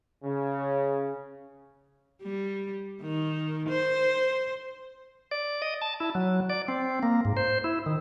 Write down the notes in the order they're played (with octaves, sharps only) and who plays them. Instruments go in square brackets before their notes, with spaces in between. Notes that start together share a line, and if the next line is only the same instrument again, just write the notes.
[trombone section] C#3
[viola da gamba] G3
D#3
C5
[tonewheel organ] D5
D#5
A5
E4
F#3
D5
C4
A#3
G#2
C5
E4
D#3